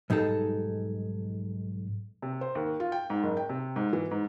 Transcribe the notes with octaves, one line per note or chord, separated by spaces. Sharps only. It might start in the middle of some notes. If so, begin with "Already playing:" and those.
B1 G#2 G3 D#4 G#4 A4
C3
C5
D#2
F4
G5
G#2
F#1
G5
C3
G#2
E3
G#2